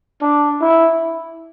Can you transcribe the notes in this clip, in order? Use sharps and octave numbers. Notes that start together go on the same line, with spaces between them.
D4
E4